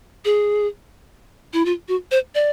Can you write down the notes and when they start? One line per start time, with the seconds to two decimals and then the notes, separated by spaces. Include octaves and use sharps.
0.25 G#4
1.53 E4
1.65 F4
1.88 F#4
2.11 C5
2.35 D5